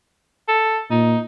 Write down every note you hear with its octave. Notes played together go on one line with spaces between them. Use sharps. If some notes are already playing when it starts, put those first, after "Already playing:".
A4
A#2 D#4